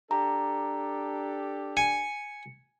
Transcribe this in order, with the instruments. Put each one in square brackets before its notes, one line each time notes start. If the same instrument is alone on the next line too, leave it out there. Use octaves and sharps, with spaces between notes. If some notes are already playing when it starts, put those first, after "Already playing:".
[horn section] D4 G4 A4 [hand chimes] A#5
[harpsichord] G#5 [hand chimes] C#7